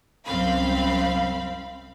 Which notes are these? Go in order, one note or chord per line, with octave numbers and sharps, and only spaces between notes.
C2 F#2 C4 F5 B5